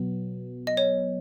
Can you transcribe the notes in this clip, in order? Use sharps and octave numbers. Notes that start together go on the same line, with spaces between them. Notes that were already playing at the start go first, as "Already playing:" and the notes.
Already playing: B2 F#3 B3
D#5
C#5